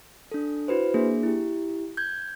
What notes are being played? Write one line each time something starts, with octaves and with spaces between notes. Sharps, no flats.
D4 A4
E4 F#4 B4 C5
A#3 D4 G#4
E4 G4
G6 G#6